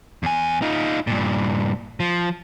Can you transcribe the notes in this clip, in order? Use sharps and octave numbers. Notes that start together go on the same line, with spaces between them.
E2 G#5
D#4 F4
G2 A#2
F3